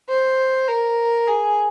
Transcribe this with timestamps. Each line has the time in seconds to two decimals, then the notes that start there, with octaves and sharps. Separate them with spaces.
0.09 C5
0.68 A#4
1.28 G#4